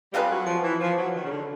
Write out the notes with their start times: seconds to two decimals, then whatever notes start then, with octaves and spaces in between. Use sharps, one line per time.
0.13 G3 C4 F4 G#4 B4
0.31 F#3
0.47 F3
0.64 E3
0.81 F3
0.98 F#3
1.15 D#3
1.25 C#3
1.31 D3